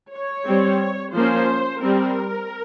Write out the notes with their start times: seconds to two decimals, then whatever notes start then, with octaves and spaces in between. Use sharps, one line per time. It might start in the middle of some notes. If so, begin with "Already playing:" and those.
0.13 C#5
0.47 G3 C4
1.14 F3 A#3 C#4 C5
1.81 G3 C4 A#4